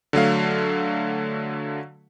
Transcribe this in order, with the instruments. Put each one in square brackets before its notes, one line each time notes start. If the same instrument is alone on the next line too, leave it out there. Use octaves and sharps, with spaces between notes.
[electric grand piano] D3 F#3 A3 F5